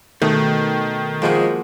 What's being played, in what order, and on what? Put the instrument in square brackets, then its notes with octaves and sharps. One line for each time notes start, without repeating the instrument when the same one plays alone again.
[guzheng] B2 [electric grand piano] D#3 [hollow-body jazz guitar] A3
[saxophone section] F3 G#3 [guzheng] A#3 F#4